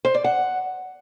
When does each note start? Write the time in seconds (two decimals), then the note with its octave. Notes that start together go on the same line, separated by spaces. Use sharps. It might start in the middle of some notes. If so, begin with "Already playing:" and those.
0.05 C5
0.15 D5
0.24 F#5